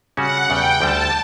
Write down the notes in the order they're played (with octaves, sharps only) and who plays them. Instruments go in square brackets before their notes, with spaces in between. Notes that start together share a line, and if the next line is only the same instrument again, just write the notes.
[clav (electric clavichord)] C#3 G3 C#4 F#4 [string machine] F#5
[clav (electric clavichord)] E2 C#3 G3 [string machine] G5
[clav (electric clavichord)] D2 D3 G3 [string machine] A5